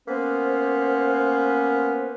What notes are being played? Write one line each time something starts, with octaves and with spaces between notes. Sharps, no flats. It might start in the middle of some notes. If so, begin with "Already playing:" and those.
A#3 B3 C#4 B4 C5